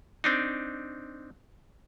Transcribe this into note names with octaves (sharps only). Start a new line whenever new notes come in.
C4 D4 D#4